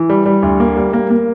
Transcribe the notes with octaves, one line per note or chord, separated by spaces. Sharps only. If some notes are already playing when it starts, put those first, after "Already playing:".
Already playing: E3
G3
G3
D2
A#3
G3
A#3
A#3